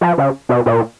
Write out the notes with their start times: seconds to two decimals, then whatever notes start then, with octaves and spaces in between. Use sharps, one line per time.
0.01 F3
0.18 C#3
0.49 B2
0.66 A#2